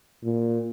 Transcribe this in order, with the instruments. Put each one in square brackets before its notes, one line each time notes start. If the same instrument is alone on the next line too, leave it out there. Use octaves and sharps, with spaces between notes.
[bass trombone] A#2